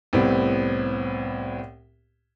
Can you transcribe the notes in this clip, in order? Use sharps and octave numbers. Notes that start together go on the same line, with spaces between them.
C2 A2 B3 C4